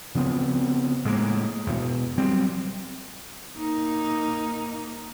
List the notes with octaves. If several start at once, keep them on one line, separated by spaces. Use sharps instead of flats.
C#3 F3 B3 C4
A2 G#3 A#3
E2 B2
F#3 G3 C4
A#3 D#4